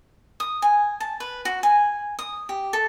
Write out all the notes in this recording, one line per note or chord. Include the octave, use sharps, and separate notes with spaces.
D#6
G#5
A5
B4
F#4
G#5
D#6
G4
A4